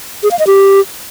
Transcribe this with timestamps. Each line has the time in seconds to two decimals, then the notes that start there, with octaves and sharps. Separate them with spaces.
0.23 G#4
0.31 F5
0.39 D#5
0.47 G4